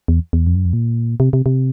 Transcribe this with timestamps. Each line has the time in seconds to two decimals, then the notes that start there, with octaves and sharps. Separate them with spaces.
0.08 E2
0.33 E2
0.47 F2
0.55 F#2
0.65 F2
0.73 A#2
1.20 C3
1.33 C3
1.46 C3